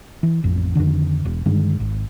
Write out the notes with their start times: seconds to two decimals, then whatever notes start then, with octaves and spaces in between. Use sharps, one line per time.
0.23 E3
0.44 A1 F2
0.75 F2 B2 D3 D#3
1.25 E1
1.46 G2 D3 D#3 G#3
1.80 G#1